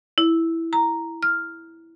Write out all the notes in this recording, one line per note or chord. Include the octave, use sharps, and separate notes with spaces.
E4
A#5
F6